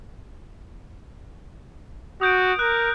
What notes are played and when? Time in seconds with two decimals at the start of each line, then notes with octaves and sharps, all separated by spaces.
2.21 F#4 D#6 G6 D7
2.59 A#4 F#6